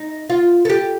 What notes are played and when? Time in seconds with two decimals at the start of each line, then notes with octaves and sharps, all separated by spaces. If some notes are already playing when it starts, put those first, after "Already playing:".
Already playing: D#4
0.30 F4
0.65 A4
0.70 G4